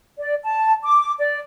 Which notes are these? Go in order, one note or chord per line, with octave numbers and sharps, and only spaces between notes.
D5
A5
D6
D5